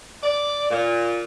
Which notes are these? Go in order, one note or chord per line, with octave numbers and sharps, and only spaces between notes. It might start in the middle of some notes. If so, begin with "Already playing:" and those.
D5
A#2